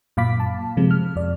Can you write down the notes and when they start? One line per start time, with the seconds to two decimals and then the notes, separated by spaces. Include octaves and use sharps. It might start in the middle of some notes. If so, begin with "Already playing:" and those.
0.17 F#2 A#2 F5 B5 D6 B6
0.40 A5
0.77 C3 F3 G#3
0.91 F6
1.16 F2 D5